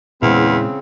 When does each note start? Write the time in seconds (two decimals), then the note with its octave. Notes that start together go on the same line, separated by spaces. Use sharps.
0.22 E2 A#2 C#3 G#3 C4 E4